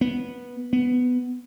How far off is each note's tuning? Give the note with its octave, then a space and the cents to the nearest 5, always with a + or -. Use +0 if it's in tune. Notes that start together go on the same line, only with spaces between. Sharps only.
B3 -10
B3 +10